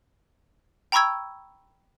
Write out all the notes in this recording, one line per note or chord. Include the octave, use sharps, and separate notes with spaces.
G5 A#5 B5 C#6 E6 G#6